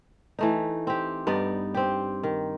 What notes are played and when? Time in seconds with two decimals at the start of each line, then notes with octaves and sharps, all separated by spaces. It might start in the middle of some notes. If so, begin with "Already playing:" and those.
0.39 E3 A3 D#4
0.87 C4 G4
1.27 G2 B3 D#4 D5
1.75 C4 G4
2.23 D#3